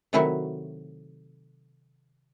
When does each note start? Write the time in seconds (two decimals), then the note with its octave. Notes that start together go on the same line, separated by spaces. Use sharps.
0.13 C3 D#3 F#3 A3 E4 F#4